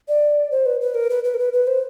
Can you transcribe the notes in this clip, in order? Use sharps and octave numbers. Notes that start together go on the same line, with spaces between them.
D5
C5
B4
B4
A#4
B4
B4
A#4
B4
B4
C5